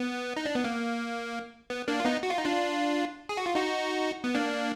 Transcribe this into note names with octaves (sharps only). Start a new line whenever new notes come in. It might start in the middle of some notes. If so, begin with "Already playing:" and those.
Already playing: B3
D#4
D4
B3
A#3
B3
A#3 D4
F4
B3 D#4
F#4
F4
D#4
D4 F4
G#4
F#4
F4
D#4 F#4
B3
A#3 D4